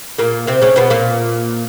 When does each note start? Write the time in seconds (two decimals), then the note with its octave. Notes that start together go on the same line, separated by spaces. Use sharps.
0.18 A#2 A#3
0.47 C3 C4
0.61 C#3 C#4
0.76 B2 B3
0.90 A#2 A#3